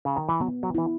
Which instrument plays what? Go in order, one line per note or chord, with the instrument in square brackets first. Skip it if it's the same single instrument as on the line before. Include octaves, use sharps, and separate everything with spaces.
[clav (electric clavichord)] C#3
D#3
E3
[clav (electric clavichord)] F#3 [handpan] B3
[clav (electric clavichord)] F#3
[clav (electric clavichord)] E3 [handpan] E4